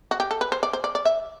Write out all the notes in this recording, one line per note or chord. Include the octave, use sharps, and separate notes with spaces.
F#4
G4
A4
B4
C5
D5
C5
D5
D5
E5